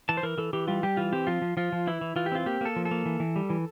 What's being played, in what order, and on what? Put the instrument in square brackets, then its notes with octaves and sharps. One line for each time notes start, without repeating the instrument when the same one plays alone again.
[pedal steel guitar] E3 A5
C5
E3 A#4
E3 A4
E3 G4
G3 F4
G3 G4
E3 F4
C4 G4
F3 F4
F3
F3 F4
F3
E3 E4
E3
E3 F4
G4
C4 F4
A#3 G4
A#3 A4
F3
A4
A#3
E3
E3
G3
E3